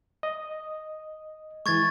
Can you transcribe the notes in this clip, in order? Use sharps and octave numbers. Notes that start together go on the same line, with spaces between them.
D#5
E3 G#3 C#6 G#6 A6